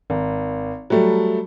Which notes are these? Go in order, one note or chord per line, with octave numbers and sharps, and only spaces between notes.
G#1
F#3 G3 A3